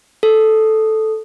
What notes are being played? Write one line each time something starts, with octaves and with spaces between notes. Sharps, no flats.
A4